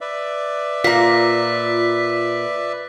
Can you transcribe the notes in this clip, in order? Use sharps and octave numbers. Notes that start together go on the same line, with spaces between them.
B4 D5 E5
A#2 F4 A#5 B6